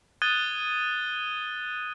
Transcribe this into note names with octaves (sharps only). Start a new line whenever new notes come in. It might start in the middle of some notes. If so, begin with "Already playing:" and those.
D#6 F#6 G#6 A6 D#7 G7